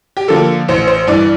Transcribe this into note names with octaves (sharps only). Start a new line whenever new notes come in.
G4
D3 F3 A#3 A4
A1 C5
C5
G2 E3 D5